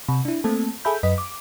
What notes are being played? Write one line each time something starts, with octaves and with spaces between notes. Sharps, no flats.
C3
D4 E4
A3 A#3 C4 A4
G#4 A4 E5 B5 G6
F#2 B4 D#5 B6
D6